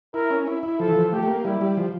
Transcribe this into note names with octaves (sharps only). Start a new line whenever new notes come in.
E4 A#4
C#4
E4
E4
F3 A4
E3
F3
A3 G4
A3
A#3
G3 E4
G3
F3